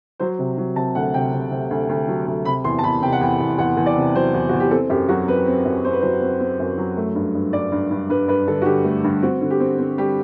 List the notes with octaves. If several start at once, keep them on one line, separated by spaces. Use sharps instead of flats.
F#3 C5
C3
F#3
C3 A5
D2 F#5
C3 G5
C3
C3
D2
D2
F#3
D2
C3 B5
E2 C6
A5
E2 B5
C3 G5
F#5
E2 G5
E2
E2 F#5
E2
D5
C3
F#3 C5
E2
E2 F#4
G4
C4 A4
F#2 G4
F#3 F#4
C4 B4
C4
F#2
C4 C5
B4
F#3 C5
C4
C4
F#2
F#3
A3
G2
G2
G2 D5
G2
G2
G2 B4
G2 B4
D3 A4
F#4
D3 G4
A3
G2
C4 F#4
D3
G4
C4
C4
G3 G4